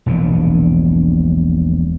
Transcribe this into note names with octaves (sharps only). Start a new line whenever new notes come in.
E1 A#1 A#2